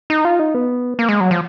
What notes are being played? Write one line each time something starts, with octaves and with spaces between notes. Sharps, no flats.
D#4
F4
D#4
B3
A#3
G#3
F#3
F3